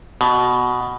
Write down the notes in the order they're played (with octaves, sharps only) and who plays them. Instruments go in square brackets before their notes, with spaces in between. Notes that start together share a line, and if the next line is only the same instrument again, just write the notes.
[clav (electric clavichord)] B2